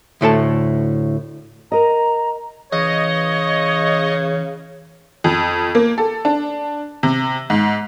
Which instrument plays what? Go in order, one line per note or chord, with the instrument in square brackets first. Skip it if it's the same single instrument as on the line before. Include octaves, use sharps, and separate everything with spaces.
[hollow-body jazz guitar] D2 A2 A4 A5
[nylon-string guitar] A#4 D#5 [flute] A#5
[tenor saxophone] C#3 [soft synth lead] E3 [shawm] C#5 [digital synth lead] D#5
[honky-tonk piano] F2
A#3
A4
D4
C3
G#2